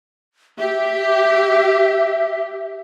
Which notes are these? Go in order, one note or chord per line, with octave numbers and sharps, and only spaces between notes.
G4 E5